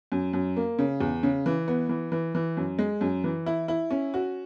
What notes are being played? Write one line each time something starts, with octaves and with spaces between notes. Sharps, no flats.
F#2
F#2
A#3
C#3
E2
C#3
E3
B3
E3
E3
E3
F#2
G#3
F#2
E3
E4
E4
C#4
F#4